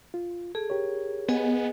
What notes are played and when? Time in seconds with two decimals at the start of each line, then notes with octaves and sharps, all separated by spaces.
0.14 F4
0.55 G#4 A4
0.70 G4 A#4 C#5
1.29 B3 G#4 D#5 G#5